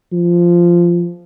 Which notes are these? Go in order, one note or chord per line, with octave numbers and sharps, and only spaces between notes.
F3